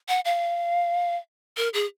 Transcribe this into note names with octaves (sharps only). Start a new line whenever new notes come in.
F#5
F5
A#4
G#4